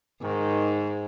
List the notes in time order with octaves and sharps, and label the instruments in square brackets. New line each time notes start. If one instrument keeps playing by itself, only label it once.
[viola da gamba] G#2 [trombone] D#3